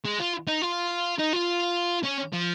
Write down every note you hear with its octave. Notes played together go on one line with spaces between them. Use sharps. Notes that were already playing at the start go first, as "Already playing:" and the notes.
G#3
F4
D#4
F4
D#4
F4
C#4
F3